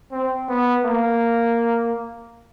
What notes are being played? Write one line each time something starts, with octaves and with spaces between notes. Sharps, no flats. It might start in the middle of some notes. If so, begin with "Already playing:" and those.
C4
B3
A#3